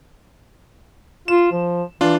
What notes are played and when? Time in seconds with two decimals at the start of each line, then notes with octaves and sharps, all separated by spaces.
1.28 F4 E7
1.52 F3
2.01 E3 D4 F4